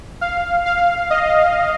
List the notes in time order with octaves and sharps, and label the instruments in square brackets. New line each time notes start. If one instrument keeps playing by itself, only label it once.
[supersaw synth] F5
F5
D#5